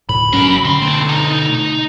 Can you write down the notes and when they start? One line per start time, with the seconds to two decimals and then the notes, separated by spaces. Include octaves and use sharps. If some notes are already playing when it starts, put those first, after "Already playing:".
0.09 D2 A2 B5
0.33 F#1 F#2 F#3 C#4 A#4
0.65 D3 C4 C6
0.82 B2 A3
1.09 D#4